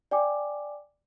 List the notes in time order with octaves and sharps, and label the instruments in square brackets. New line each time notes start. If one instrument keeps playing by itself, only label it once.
[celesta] D5 G5 G#5 D6